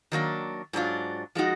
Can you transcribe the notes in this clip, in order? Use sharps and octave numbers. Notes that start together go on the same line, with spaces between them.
D#3 F#3 A#3 D4
G#2 F#3 D4 F4
F3 G#3 D#4 F#4